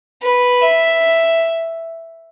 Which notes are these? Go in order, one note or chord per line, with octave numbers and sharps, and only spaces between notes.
B4
E5